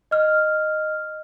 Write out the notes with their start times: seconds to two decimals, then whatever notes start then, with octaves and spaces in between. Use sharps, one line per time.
0.11 D#5 F6